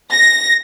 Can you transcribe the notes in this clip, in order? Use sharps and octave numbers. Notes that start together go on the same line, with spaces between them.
A#6